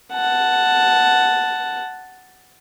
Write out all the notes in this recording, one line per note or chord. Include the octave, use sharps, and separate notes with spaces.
F#5 A5